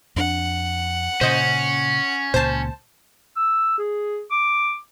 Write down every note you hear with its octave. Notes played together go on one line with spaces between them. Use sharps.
F2 D4 F#5
A#2 C#3 C#4 C5 D#5
C#2 A#2 C5 A5
E6
G#4
D6